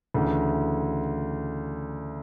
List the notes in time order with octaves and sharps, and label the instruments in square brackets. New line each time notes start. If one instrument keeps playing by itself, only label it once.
[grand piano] D2 C#3 E3